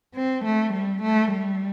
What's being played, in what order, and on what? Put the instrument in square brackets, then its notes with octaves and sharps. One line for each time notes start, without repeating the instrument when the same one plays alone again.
[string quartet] C4
A3
G3
A3
G3